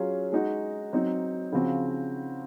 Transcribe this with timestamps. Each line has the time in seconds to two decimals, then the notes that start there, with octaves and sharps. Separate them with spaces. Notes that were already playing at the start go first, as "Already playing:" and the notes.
Already playing: F#3 C#4 F4 G#4
0.32 G#3 D#4 F#4
0.93 F#3 C4 D#4
1.52 C#3 F3 C4 F#4